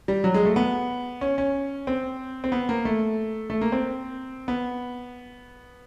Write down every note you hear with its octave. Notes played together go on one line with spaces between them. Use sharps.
G3
F#3
G#3
A3
B3
C#4
C#4
C4
C4
B3
A#3
A3
A3
A#3
C4
B3